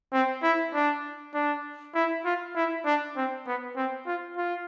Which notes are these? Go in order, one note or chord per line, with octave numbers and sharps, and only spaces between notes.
C4
E4
D4
D4
E4
F4
E4
D4
C4
B3
C4
F4
F4